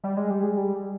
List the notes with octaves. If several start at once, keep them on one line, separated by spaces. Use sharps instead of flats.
G3
G#3
G3
G#3
G3